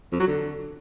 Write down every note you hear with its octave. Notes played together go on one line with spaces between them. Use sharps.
F2
F#3
D3